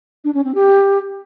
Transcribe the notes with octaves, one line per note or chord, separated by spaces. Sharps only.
D4
C#4
C4
G4